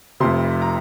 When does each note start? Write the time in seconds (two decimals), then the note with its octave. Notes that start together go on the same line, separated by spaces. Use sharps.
0.20 F1 F2 C3 C6
0.62 A#5